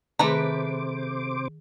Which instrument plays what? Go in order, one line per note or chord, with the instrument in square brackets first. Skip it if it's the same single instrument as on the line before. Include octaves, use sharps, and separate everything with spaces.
[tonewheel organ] C3 C5 D6 [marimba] D#3 G#4 [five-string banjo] A3 B4 A#5